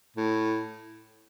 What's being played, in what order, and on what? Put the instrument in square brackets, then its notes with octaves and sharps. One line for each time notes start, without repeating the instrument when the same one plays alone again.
[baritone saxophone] A2